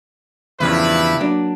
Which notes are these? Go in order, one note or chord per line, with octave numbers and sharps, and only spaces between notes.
E2 G2 C#3 F3 E4 B4
F#3 A#3 D4